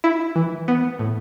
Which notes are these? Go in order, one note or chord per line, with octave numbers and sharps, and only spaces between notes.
E4
E3
B3
A2